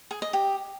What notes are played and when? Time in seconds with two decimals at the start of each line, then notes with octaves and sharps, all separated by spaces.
0.11 G#4
0.22 D#5
0.33 G4